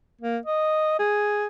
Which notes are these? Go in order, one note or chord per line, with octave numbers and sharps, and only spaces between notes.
A#3
D#5
G#4